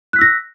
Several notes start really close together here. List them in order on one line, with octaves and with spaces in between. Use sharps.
F#6 B6 E6 A#6